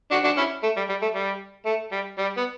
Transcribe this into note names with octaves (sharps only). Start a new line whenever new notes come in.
D4 F#4
D4 F#4
C#4 E4
A3
G3
G3
A3
G3
A3
G3
G3
B3